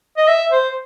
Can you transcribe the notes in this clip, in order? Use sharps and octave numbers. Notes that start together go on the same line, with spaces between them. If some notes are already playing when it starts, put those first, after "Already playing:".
D#5
E5
C5